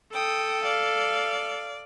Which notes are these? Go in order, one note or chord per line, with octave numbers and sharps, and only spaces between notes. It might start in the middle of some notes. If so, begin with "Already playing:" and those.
A4 G5 D#6
D5 F5